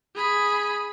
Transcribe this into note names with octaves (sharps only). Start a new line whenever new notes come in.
G#4 B5